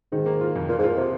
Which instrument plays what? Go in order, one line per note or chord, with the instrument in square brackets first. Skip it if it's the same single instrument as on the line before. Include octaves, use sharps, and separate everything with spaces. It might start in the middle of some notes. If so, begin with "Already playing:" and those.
[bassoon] G#2 [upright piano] D#3
[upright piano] A#3
F4
F2
[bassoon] A#2 [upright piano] F4
[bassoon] G#2
[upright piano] F4
[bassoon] A#2
[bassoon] C3 [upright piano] F4